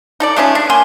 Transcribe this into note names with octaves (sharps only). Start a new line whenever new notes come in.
D#4 A4 D5
G#3 A3 C#4 F4
D4
A#3 G#5 C6